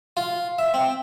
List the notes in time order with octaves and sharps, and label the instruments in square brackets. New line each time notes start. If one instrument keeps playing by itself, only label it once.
[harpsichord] F4
E5
C4